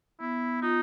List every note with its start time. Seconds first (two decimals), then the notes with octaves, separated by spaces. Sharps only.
0.20 B3 E4
0.62 D#4 F4